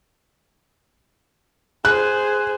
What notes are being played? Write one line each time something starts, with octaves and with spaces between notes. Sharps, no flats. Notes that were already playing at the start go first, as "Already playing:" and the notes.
G#4 C5 F#6